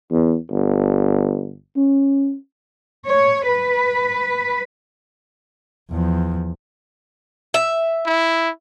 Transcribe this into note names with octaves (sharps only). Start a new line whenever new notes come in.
E2
G1
C#4
C#5
B4
E2 F3
E5
E4